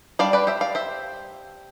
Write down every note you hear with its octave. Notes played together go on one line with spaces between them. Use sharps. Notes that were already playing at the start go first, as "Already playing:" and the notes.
G3 D4 D5 F5
B4 D5
C5 E5
D5 F5
C5 E5